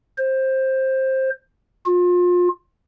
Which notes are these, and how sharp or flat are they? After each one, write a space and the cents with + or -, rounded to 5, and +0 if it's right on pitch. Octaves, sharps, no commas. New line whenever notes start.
C5 +15
F4 +30